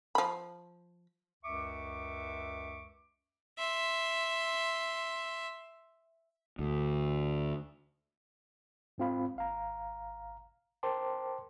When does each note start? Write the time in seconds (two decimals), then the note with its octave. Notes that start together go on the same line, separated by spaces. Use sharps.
0.15 F3 B5
1.44 C#2 F#2 E5 C#6 D6
3.58 E5 C6
6.59 D2
8.98 G#2 G#3 C4 F4 F5 B5
9.36 G#1 F5 A#5
10.83 A#4 C5 G5 A5 C6 D6